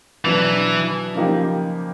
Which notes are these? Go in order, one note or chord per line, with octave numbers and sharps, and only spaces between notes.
B2 E3 F#3 B3 D4
C#3 F3 A#3 D#4 G4